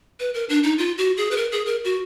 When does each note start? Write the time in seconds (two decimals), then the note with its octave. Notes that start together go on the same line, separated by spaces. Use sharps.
0.20 B4
0.34 A#4
0.49 D4
0.64 D#4
0.78 F4
0.98 F#4
1.17 G#4
1.31 B4
1.37 A#4
1.52 G#4
1.66 A#4
1.84 F#4